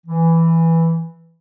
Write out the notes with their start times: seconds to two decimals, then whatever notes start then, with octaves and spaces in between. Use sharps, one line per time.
0.06 E3